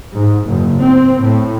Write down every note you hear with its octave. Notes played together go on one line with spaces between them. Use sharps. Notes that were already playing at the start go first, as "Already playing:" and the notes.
G#2
F#1
C4
A2